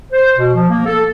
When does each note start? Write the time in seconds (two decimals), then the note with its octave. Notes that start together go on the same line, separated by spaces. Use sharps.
0.12 C5
0.36 B2
0.55 F3
0.70 A#3
0.86 A4